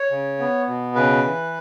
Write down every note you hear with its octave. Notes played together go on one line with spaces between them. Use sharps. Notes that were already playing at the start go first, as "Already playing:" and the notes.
Already playing: C#5
C#3
B3
B2
C#3 B4
E3